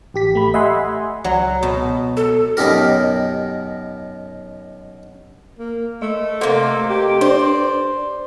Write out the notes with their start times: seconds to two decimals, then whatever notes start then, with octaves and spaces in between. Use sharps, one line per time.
0.14 A1 G4 B6
0.34 A1 A3 B5
0.54 D#5 E5 F#5 G#5 B5 C6
1.24 C#2 F#3
1.63 B2
2.17 A4
2.57 F#2 B2 D#4 G4 A#4
5.59 A#3
6.02 A3 D#5
6.41 C3 A#3 A4 D#5
6.90 G4
7.21 D4 C5 D5